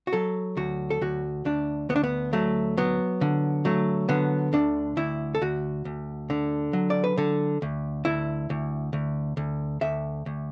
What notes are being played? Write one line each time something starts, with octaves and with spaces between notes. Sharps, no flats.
F#4
F#3 A4
D2 F#4
A4
D2 F#4
D2 D4
D2 B3
D4
B3
F#3 A3
F#3 B3
D3
F#3 A3
D3 B3
D2 D4
D2 E4
A4
D2 F#4
D2
D3
F#3
D5
B4
D3 A4
D2
D2 E4
D2
D2
D2
D2 E5
D2